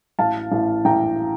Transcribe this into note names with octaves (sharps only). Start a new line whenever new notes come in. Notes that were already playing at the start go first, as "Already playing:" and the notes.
A1 F5 A5
A1
A1 G5 A#5